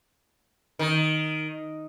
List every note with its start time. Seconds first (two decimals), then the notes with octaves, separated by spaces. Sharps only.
0.79 D#3